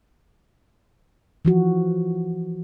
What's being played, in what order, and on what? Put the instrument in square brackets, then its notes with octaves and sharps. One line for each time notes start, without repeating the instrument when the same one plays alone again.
[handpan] E3 F3 F#4